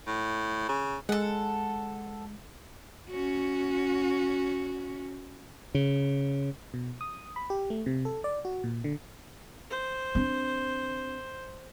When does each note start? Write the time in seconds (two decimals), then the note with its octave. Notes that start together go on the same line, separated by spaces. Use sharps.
0.07 A2
0.69 C#3
1.09 G#3 A4 F#5
3.10 C#4 F#4
5.75 C#3
6.74 B2
7.01 D#6
7.36 B5
7.50 G4
7.70 A3
7.86 C3
8.05 A4
8.24 D5
8.45 F#4
8.64 A#2
8.84 D3
9.70 C5
10.15 C4 D4